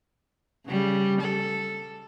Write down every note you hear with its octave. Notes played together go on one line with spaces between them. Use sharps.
C#3 G3
A4